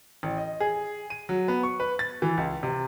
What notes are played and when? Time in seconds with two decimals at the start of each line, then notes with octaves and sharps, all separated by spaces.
0.23 A1
0.38 D#5
0.60 G#4
1.10 D#7
1.29 F#3
1.48 B3
1.63 C#6
1.80 B4
1.99 A6
2.22 E3
2.37 C#2
2.63 C3